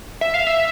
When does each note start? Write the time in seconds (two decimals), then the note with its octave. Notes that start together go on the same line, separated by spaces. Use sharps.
0.21 E5
0.34 F5
0.47 E5